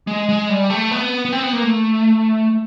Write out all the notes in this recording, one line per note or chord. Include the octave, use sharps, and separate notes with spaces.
G#3
G#3
G3
A3
B3
B3
C4
B3
A#3
A3